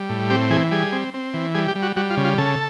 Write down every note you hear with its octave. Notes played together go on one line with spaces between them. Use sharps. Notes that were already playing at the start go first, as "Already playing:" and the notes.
Already playing: G3
A2
C4 G4
E3 G#4
G3 G#4
C4
C4
E3
G3 G#4
G4
G3
F#4
G3 F#4
F4
C#3
F4
C#3 A4